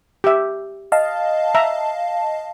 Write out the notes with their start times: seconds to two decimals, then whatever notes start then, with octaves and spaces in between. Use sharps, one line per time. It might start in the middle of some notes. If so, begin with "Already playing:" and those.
0.24 G4 E5
0.92 D#5 F5 A5
1.55 E5 A#5